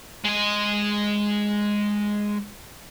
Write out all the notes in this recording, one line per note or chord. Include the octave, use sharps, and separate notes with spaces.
G#3 D#5